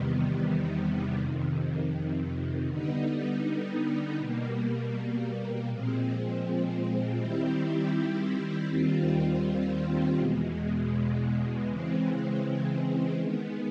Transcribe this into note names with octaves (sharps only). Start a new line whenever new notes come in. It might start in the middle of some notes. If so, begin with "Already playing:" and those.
Already playing: E2 C3 D#3 G3 B3
F2 C3 D#3
D3 G3 B3 D#4
B2 G3 A#3
A#2 F3 G#3 C4
D#3 G3 C4 E4 G4
D#2 D#3 G3 C4 F4
E2 B2 G#3
C#3 E3 G#3 C4
D#3 G#3 B3